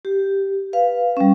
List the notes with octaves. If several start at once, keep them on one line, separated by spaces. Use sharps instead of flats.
G4
B4 F5
G3 C#4